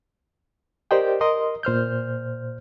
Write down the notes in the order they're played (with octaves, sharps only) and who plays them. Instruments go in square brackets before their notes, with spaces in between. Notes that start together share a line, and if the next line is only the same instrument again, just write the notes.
[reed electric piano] G4 A#4 C5 D5 D#5 G5
A#4 D#5 C6 D#6
A#2 C5 F6 G6